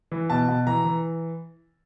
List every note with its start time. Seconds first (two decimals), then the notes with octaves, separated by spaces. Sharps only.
0.12 E3
0.30 B2 A5
0.48 B2
0.67 E3 A#5
0.85 E3